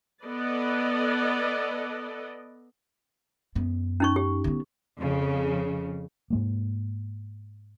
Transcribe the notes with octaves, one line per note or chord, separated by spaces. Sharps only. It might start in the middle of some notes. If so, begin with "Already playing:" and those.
B3 A4 B4 D5 D#5
F#2 B3
C#4 D#4 C#6
G4
D3 B3
F2 C#3
G#2 G#3 A#3